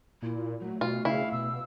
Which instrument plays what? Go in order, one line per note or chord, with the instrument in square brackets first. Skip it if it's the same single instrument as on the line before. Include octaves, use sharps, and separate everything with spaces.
[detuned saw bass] A#2 [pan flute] E4
[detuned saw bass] F#3 [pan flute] A3
[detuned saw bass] B2 [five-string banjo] F4
[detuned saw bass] C#3 [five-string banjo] E4 [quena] F5
[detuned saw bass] B2 [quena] E6